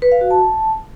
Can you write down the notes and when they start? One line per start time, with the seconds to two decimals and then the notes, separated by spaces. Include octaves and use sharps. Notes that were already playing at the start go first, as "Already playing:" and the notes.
0.02 B4
0.12 F5
0.21 F#4
0.31 A5